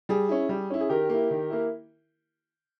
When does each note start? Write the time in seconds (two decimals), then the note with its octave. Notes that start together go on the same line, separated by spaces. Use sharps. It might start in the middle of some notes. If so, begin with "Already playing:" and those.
0.09 G3 G#4
0.29 C#4 E4
0.49 G3
0.70 C#4 E4
0.80 G#4
0.89 D#3 G4 A#4
1.09 A#3 E4
1.31 D#3
1.50 A#3 E4